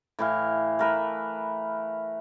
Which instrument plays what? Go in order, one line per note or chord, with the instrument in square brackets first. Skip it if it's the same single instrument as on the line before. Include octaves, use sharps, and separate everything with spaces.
[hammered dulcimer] A2 E3 F5
A3 A#4 B4